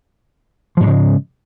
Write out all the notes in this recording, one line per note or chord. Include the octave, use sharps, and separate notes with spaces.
G#2 C#3 F3 G#3